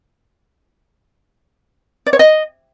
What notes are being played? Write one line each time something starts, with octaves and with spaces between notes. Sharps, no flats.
D5
C#5
D#5